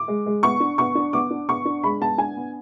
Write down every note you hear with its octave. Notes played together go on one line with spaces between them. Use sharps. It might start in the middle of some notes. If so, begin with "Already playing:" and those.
Already playing: D6
G#3
G#3
B3 C#6
D4
B3 C#6
D4
B3 D6
D4
B3 C#6
D4
G#3 B5
B3 A5
D4 G#5
B3